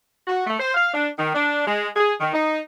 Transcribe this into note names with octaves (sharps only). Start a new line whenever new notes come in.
F#4
A3
C5
F5
D4
D#3
D4
G#3
G#4
D#3
D#4